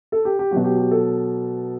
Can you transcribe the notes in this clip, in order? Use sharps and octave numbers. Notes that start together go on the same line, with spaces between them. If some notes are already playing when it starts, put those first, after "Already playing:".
A4
G4
G4
B2 F#3 F#4
G4
G4
A4